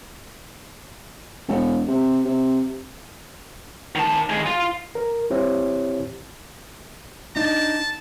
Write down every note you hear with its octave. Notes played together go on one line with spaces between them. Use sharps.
E1
C3
C3
D#3 A5
D#3 G#4
F4
A#4
C4 E4 G4 C5 C#5
D4 D#4 A5